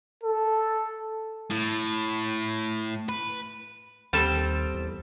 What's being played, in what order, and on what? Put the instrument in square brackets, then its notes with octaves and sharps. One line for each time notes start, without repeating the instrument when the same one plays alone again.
[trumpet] A4
[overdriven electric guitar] A2
B4
[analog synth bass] D#2 [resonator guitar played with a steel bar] G3 C4 A4
[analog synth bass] E2